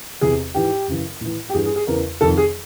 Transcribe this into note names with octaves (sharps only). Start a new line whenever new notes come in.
E2 C3 E3 G#4
G#2 E3 G4
F#2 C#3 E3
A2 E3
G4
G2 E3 G#4
G#4
G#4
E2 C#3 E3 A#4
F2 C3 D#3 A4
G#4